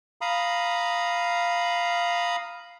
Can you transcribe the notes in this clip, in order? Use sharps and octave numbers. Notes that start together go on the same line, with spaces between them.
F5 A#5 B5 D#6